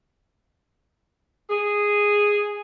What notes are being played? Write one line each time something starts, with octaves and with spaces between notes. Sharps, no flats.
G#4